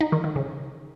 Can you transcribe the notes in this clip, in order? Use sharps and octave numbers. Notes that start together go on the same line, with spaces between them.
D#4
D#3
D#3
C#3